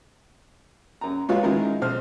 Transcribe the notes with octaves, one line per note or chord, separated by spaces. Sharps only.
F#2 A#5
G#3 F4 F#4 B4 C#5 F5
D#3 G#3 E4 F4 A#4
B1 C5 F6